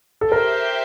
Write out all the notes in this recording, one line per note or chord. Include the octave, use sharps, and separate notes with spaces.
A4
G4 A#4 C5 E5 G5